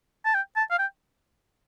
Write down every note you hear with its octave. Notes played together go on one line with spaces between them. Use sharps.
A5
G5
A5
F5
G5